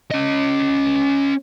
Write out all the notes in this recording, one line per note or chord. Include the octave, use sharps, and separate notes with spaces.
C#4 D#5